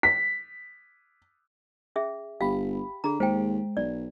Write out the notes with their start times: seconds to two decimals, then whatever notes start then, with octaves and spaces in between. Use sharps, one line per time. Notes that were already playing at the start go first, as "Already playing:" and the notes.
0.03 B6
1.96 C#4 G#4 E5
2.41 G1 G4 F5 B5
3.04 D3 G#4 A#5
3.20 D#2 G#3 C5 G5
3.77 B1 D5